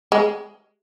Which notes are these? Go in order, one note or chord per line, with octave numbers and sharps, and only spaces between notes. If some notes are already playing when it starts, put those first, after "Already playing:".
G#3